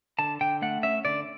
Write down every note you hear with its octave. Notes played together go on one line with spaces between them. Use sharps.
D3 A5
D3 G5
A3 F#5
C#4 E5
D3 D5